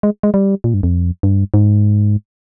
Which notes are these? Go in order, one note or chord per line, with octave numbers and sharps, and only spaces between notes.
G#3
G#3
G3
A#2
G2
F2
G2
G#2